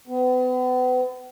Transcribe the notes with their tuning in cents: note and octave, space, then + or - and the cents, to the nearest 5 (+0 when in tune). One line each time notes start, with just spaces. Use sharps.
B3 +40